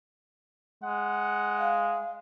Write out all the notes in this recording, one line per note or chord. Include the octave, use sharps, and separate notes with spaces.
G#3 F#5
F5